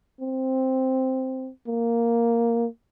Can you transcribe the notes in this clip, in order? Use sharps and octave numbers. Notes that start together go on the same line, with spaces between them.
C4
A#3